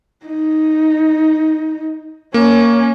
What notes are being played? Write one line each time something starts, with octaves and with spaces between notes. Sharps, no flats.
D#4
A#3 C#4